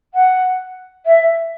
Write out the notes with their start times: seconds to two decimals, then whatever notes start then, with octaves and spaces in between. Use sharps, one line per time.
0.14 F#5
1.06 E5